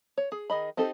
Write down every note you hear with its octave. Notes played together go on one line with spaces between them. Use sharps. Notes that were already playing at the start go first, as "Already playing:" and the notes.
C#5
G#4
D#3 G#4 D#5 B5
C4 D#4 G4 A4